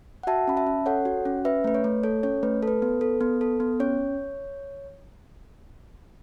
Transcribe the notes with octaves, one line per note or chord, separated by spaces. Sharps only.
F#5
F#4 E5 A5
C#4 B5
E5 A5
C#4
A4 C#5 F#5
F#4
C#4
C#4 B4 E5
A3 B4
C#5
A3
A4 C#5
C#4 C#5
A3 B4
A4
B4
B3
A4
B3
A4
B3
C#4 C#5